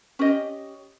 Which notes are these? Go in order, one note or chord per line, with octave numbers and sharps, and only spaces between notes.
C#4 G4 D#5